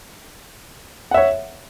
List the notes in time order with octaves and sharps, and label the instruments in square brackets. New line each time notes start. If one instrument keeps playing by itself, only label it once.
[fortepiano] F#5
E5
C#5